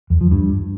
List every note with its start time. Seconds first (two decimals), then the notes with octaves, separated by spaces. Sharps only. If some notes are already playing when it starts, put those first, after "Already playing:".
0.10 E2
0.21 F3
0.32 G2